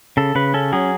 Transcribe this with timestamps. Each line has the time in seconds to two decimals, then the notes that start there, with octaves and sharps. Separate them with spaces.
0.17 C#3 A4
0.35 C#3 B4
0.54 C#4 A4
0.73 F#3 G#4